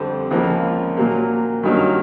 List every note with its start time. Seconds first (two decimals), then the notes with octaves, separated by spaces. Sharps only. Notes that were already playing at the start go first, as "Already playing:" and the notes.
Already playing: F2 D3 G3 C4
0.31 C#2 C#3 F3 A#3
0.97 A#2 F#3 A#3
1.63 G2 D#3 F#3 A#3 C#4